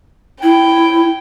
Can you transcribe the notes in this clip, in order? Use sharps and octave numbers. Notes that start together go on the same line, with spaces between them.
E4 G5